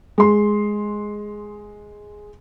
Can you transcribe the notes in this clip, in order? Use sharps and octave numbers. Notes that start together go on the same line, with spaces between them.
G#3 C6